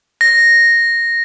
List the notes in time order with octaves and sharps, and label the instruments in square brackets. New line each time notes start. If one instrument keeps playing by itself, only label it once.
[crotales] A#6